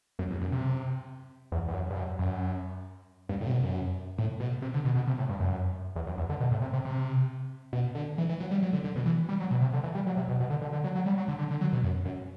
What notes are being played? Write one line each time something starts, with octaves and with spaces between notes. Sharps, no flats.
F#2
E2
F#2
C3
E2
E2
F#2
G2
F#2
F#2
G2
A2
C3
B2
F#2
A2
B2
C3
D3
B2
B2
C3
A2
G2
F#2
E2
F#2
E2
D3
B2
A2
C3
C3
C3
B2
D3
E3
E3
F#3
G3
F#3
D3
D3
B2
E3
G3
F#3
B2
C3
D3
E3
G3
F#3
C3
B2
B2
D3
D3
D3
F#3
F#3
G3
F#3
D3
D3
D3
F#3
B2
F#2
F#2